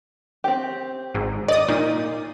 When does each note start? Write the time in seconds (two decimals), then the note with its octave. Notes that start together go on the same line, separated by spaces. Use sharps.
0.44 C4 G4
1.15 G#1 G#2
1.48 D5 D#5 D#6
1.68 A#2 D#4